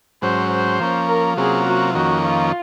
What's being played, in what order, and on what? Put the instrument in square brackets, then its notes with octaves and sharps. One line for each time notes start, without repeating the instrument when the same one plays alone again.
[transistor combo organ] G#2 F#3 C#4 [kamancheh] C5
[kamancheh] C5
[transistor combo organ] F3 A#3 C#4
[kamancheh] A#4
[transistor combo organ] C3 F#3 A#3 C#4 F4 [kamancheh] G#4
[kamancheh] F#4
[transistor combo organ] F2 D#3 A#3 C#4 [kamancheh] F#4
[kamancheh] F4